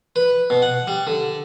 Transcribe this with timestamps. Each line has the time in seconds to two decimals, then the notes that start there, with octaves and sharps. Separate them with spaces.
0.16 B4
0.50 B2
0.62 F#5
0.88 G3
1.07 D3